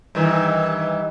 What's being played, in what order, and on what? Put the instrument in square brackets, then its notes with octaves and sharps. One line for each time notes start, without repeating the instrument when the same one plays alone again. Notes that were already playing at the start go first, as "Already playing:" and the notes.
[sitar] G2 D#3 E3